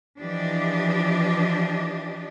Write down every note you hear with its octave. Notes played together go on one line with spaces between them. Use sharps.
E3 F3 D4 G4 D#5